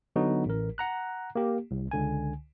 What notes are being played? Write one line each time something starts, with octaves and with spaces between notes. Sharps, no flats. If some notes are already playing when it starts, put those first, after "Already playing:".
D3 F#3 B3 D#4 F#4
A1 A#4
F#5 A#5 F#6
A#3 G4
C2
C#2 D3 G#5